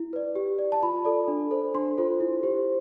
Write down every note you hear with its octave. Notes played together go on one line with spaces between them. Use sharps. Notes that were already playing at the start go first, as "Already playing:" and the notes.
Already playing: E4
B4 D5
G4
D5
A5
F4 B5
A4 D5
D4
A4 C5
D4 C6
F4 A4 C5
E4
G4 C5